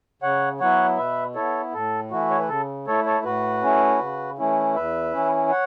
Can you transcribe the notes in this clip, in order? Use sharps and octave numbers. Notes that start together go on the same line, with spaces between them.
C#3 C#5 F#5
F#3 B3 E4 C#5 F#5
B2 B4 E5
B3 E4 A4 C#5
A2 A4
E3 A3 E4 F#4
C#5
B4
C#3 A4
A3 E4 A4 C#5
A4 C#5
A2 F#4 B4
A3 C#4 E4
C#3
E3 A3 C#4 E4
E2 B4 E5
E3 C#4 E4
C#5 F#5